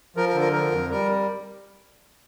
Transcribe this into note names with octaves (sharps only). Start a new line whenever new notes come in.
F3 A#4
A#4
D3
A#4
F3 A#4
F2
G3 A#4